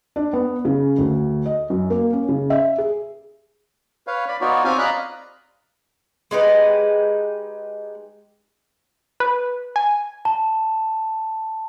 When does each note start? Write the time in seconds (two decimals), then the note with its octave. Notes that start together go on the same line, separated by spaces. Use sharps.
0.16 D4
0.33 B3
0.65 C#3
0.98 D2
1.46 D#5
1.70 F#2
1.90 A#3
2.13 C#4
2.29 C#3
2.50 E5
2.78 G#4
4.07 B4 C#5 F5
4.28 D5 B5
4.41 B3 D#4 F4 F#4 C#5 D5
4.64 C4 F4 G4 C#5 F5 G#5
4.79 D5 D#5 F5 A#5 B5 F#6
6.31 G#3 D#4 G4 B4
9.20 B4
9.76 G#5
10.25 A5